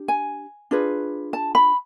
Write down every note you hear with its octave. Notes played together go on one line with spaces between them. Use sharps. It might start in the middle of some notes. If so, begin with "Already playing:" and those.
Already playing: D4 G4
G#5
D4 F4 G#4 B4
A5
B5